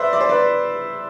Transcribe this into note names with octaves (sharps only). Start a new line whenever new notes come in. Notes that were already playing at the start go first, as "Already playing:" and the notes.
Already playing: B4 C5 D5 E5
D5
C5
B4 D5